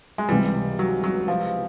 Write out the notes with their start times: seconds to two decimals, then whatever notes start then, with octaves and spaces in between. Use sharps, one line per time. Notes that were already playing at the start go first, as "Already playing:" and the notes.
0.18 G#3
0.29 C#2 C3 E3 G3
0.79 F#3
1.04 F#3
1.28 F3